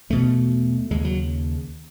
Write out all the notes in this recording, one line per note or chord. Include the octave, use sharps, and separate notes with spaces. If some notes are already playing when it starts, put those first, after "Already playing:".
E2 B2 A3
D#2 C#3 G#3
F#3